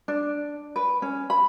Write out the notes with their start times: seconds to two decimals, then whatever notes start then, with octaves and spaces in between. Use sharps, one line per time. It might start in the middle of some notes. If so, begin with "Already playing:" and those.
0.08 D4
0.76 B4
1.02 C#4
1.30 B5